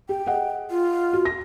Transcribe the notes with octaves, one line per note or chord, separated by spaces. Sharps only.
G4 G5
G#4 D#5 F#5
F4
F#4
A#6